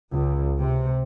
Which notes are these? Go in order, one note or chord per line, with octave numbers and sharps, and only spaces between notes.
C#2
C3